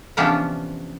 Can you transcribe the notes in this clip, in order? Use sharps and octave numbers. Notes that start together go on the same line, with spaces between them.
C3 E3 F3 B3 C#4 D4